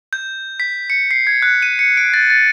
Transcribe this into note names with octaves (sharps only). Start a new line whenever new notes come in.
G6
B6
C#7
C7
G#6
F#6
D#7
C#7
D7
A6
A6